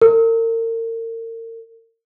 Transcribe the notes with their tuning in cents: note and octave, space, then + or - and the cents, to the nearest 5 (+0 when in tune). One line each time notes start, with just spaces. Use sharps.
A#4 -40